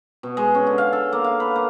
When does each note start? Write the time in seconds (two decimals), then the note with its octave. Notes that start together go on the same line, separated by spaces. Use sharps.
0.23 B2
0.37 G#3
0.55 C#4
0.67 D3
0.78 F5
0.93 A4
1.12 A#3
1.24 F5
1.40 B4
1.56 A#3